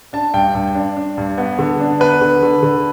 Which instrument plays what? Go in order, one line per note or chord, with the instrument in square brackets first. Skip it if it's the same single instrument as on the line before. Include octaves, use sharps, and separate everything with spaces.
[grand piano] D4 A5
G2 G5
G2
D4
D4
G2
B3
D3
D4
B3 B4
D3
D3
D3